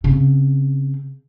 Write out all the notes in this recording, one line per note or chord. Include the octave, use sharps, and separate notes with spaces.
C#3 C4